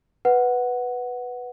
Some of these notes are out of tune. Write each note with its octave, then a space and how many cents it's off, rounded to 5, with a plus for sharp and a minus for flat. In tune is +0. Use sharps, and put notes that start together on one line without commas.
B4 +0 F#5 +0